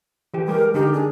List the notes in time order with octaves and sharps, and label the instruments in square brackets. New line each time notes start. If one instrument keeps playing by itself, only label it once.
[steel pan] E3 G4
[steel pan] G3 G#3 G4 [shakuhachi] A#4
[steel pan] D3 D#4 A#4 [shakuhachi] G4
[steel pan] D4 [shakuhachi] G#4